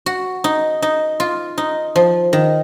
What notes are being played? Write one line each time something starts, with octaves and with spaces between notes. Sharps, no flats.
F#4
D#4
D#4
F4
D#4
F3
D#3